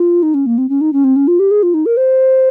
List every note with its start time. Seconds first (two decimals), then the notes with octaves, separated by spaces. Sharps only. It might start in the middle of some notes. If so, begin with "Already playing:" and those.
Already playing: F4
0.23 D#4
0.34 C#4
0.46 A#3
0.58 C4
0.69 C#4
0.81 D#4
0.93 C#4
1.04 C4
1.16 C#4
1.28 F4
1.39 G4
1.51 G#4
1.63 F4
1.74 D#4
1.86 A#4
1.97 C5